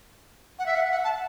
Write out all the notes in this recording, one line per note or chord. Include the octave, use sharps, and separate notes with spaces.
F#5
E5
F#5
F#5
A5